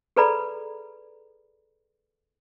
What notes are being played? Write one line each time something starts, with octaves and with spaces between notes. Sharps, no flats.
G#4 A4 B4 D5 A#5 B5